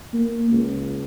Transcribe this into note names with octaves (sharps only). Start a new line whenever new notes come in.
A#3
C#2